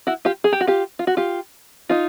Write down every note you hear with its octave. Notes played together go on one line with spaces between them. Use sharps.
E4 F#4
F4 G4
G#4
G4
F#4
F4 G4
F4
F#4
F4 G4
D#4 F4